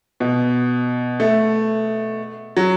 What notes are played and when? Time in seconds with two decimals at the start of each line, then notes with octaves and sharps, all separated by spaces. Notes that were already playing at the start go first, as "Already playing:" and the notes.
0.20 B2
1.20 A3
2.57 F#3